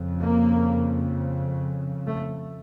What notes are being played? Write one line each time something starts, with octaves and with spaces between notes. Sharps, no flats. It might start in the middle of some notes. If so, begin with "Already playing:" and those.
Already playing: F2 C#3
A#3
A3